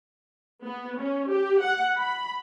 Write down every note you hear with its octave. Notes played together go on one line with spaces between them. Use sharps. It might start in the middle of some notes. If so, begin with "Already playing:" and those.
B3
C#4
G4
F#5
B5